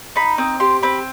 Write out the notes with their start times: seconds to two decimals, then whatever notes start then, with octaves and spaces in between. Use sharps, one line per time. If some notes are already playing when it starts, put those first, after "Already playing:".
0.16 D#4 B5
0.38 C4 D#6
0.60 G4 C6
0.82 C4 B5